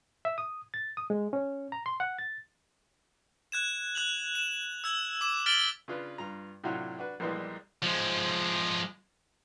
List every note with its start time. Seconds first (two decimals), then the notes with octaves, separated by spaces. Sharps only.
0.25 E5
0.38 D#6
0.74 A6
0.97 D#6
1.10 G#3
1.33 C#4
1.72 A#5
1.86 C6
2.00 F#5
2.18 A6
3.52 F#6 G#6 E7
3.95 F#6 F7 F#7
4.35 E7
4.84 E6 G#6
5.21 D6 E7
5.46 F6 A6 B6 D7 F#7 G7
5.88 C#3 D4 F4 B4
6.18 G2 F4 A#5
6.64 A2 C3 F#3 D4 F4 F#4
6.98 D4 F#4 B4
7.20 A#1 A#2 E3 G3 G#3 A#3
7.82 F3 G#3